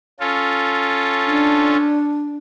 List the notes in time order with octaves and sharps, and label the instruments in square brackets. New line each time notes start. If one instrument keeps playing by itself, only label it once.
[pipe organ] C#4 F4 A4
[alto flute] D4